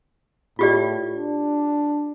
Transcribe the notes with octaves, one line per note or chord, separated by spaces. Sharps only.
A2 F4 G4 D5
D4